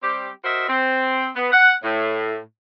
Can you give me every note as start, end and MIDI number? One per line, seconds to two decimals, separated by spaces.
0.02 0.29 55
0.02 0.29 60
0.02 0.29 67
0.44 0.66 66
0.44 0.66 70
0.44 0.66 72
0.44 0.66 75
0.44 0.66 76
0.68 1.28 60
1.36 1.52 59
1.52 1.72 78
1.83 2.38 45